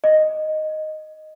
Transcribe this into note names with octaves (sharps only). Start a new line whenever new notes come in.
D#5